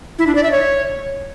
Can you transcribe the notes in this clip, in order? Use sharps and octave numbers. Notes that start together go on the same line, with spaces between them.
E4
D4
D5
E5
C#5